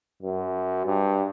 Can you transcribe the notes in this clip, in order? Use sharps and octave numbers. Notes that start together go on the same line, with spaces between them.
F#2
G2